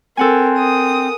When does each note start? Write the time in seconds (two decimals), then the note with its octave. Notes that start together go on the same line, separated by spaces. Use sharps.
0.17 C4 A4 A#4 F#5 G#5
0.57 A#4 D#6